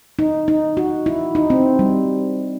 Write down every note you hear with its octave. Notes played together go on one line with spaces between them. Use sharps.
D#4
D#4
F#4
E4
D#4
C4
G3